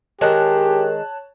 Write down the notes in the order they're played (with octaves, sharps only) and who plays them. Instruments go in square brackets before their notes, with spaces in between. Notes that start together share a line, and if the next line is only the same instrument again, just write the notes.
[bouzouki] D#3 G#3 [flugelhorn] G4 [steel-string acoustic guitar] A#4 [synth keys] C#5 A5 F#6